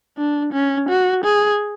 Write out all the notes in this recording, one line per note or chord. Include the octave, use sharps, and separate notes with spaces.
D4
C#4
F#4
G#4